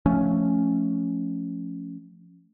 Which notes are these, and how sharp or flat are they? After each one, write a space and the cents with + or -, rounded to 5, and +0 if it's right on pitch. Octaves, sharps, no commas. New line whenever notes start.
F3 +0 A3 -5 C#4 +0